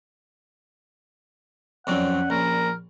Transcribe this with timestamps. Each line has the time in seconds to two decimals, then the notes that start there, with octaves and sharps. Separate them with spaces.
1.87 F2 F#3 C4 C#4 D5 F#5
2.30 A#1 A#4